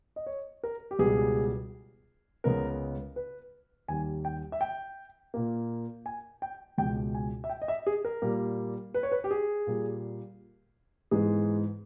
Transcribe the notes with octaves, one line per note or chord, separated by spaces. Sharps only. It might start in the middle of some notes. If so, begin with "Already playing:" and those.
D#5
C#5
A#4
G4
C#2 B2 G3 B3 G#4
C#2 C#3 G#3 B3 A#4
B4
D#2 D#3 G3 G#5
G5
E5
G5
A#2 A#3
G#5
G5
C#2 B2 G#3 G5
G#5
E5
G5
D#5
E5
G#4
A#4
A#2 G3 A#3
B4
C#5
B4
G4
G#4
A#2 G3 A#3
G#2 E3 G#3 B3 G#4